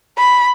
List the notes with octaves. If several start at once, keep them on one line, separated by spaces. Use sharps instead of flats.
B5